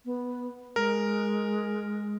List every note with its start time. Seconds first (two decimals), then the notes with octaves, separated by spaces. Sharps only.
0.05 B3
0.76 G#3 A#4